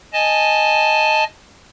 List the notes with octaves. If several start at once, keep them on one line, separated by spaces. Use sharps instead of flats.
D#5 G#5 A5